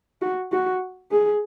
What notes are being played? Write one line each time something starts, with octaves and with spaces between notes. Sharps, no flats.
F#4
F#4
G#4